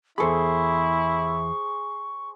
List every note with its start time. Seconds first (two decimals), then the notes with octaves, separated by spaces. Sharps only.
0.18 E2 E4 G#4 A4 C5 B5 C#6